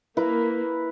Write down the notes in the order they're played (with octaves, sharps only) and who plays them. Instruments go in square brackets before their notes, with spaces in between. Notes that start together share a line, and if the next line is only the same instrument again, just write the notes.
[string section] A#3 [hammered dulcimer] E4 A#4 B4